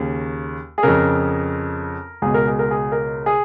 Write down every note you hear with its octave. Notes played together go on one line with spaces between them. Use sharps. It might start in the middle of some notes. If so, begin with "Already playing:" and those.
Already playing: D#2 C#3
G#4
F2 C#3 A#4
C#2 B2 G#4
A#4
G#4
A#4
G#4
A#4
G#4